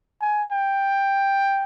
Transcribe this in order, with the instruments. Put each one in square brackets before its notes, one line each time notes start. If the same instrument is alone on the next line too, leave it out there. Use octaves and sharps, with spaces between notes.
[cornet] G#5
G5